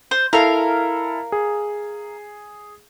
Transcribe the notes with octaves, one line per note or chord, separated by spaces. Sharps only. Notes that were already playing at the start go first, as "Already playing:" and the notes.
C5
E4 A4 A#4 F5
G#4